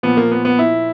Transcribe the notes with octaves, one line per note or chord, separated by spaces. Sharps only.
A#2 F3 B3
A#3
B3
B3
E4